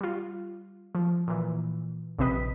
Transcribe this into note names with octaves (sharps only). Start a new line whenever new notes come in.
G3 F4
F3
A#2 E3
A#1 C3 C4 B4 D#5 B6